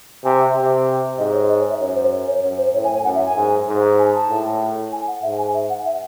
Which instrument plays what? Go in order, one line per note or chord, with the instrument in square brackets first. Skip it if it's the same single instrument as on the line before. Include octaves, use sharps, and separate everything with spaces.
[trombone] C3 [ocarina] G#5
[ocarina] E5
[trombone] C3
[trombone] G#2 [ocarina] D#5
[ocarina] C#5
D#5
C#5
E5
[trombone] F#2 [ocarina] C#5
[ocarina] C5
C#5
C#5
[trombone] F#2 [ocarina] C#5
[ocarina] C5
[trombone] A2 [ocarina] C#5
[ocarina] G#5
G#5
[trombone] F#2 [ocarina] F#5
[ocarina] E5
G#5
[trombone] G#2
G#2
[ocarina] G#5
A5
[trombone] A2
[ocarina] G#5
F#5
[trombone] G#2 [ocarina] E5
[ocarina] G#5
E5
F#5
E5